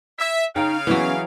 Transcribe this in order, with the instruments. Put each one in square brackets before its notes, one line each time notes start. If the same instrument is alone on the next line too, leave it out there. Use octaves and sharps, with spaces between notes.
[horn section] E5
[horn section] C#3 F5 [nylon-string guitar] D#4 G5
[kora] E3 F#3 [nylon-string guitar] B3 C#4